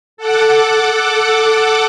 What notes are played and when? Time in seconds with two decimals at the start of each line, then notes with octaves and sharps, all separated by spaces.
0.17 A4 F#5 D6